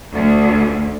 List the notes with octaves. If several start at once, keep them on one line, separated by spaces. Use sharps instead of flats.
D2